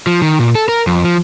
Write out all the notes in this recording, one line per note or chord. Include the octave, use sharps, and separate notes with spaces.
F3
D#3
A#2
A4
A#4
F2
F3